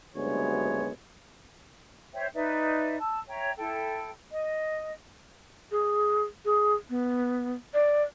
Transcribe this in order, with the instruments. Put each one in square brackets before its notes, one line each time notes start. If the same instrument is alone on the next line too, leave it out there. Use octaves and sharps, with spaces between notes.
[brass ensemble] F#1 D2 G2 G#3 B3 C#5
[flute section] C5 C#5 E5 G5
D#4 B4 D5 E5
A5 E6
C#5 E5 G5 A#5
E4 A4 G5
D#5
[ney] G#4
G#4
B3
D5